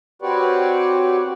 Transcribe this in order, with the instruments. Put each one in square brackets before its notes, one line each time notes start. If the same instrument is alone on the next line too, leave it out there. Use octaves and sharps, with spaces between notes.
[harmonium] C4 F#4 G4 B4 C#5 D5